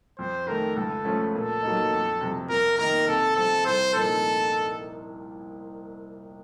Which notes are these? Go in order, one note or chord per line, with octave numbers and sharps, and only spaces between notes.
F2 C5
D#3 A3 A#4
C#2 A4
C#3 F3 A3 C#4
A#2 A4
F#3 A#3 D#4
F2
C3 F3
F2 A#4
D#3 A#3 D#4 A#4
C3 A4
F3 C4 A4
C2 C5
A#2 F3 A#3 D#4 A4